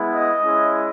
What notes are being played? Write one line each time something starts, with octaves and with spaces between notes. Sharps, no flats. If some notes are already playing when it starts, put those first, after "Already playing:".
Already playing: G#3 B3 E4
D#5
G#3 C#4 E4